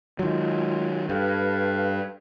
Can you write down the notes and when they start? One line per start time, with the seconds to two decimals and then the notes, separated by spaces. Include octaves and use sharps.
0.19 D#3 F#3 G#3 F4
1.09 G2 A4 B4 F5